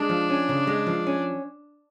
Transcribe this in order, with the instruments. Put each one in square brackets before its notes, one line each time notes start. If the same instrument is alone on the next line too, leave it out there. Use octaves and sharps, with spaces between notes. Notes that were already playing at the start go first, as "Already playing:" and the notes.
Already playing: [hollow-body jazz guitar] G#3 [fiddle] D4
[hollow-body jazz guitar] F3
C#4
C#3
G#3
F3
C#4